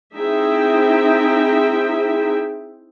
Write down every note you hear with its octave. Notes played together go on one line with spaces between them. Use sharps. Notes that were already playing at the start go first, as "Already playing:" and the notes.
C4 D#4 E4 G#4 E5 G5